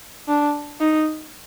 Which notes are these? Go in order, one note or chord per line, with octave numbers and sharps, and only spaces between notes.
D4
D#4